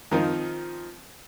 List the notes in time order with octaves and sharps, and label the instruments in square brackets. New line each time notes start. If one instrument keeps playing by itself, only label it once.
[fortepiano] D#3 F3 C4 D#4